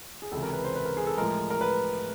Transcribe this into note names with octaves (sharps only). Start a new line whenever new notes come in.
G#4
C#2 C3 E3 A4
A#4
B4
C5
B4
A#4
G#4
A4
A2 F3 G#3 A#4
A#4
B4